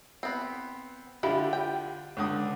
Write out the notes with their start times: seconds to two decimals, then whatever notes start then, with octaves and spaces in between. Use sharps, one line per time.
0.23 B3 C4
1.23 D3 E4 F4 G4
1.53 G5
2.17 C#2 D3 D#6